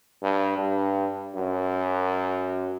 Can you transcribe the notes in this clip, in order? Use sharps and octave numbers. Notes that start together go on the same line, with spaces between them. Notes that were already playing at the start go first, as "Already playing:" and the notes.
G2
G2
F#2